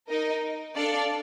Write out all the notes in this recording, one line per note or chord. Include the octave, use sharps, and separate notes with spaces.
D#4 A#4 D#5
D4 A4 D5 F5 A5